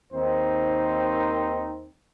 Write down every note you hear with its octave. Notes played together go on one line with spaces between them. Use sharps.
D#2 D#3 C4 D#4 C5